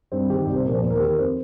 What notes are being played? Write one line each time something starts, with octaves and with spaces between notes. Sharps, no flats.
G2 C4
D#3 G4
C2
C5
A#2 F3 A#4 C5
D#2 C5
A#4
D#3 G4
A#4
F2 C5